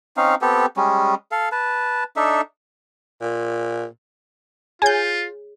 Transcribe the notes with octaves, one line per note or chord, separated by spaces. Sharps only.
C4 C#4 D#4 F5
B3 C4 G4 A4
G3 G#3 C#4
A4 F5
B4 A5
D4 D#4 A4 E5
A#2
F4 G#4 C#5 G#5 G6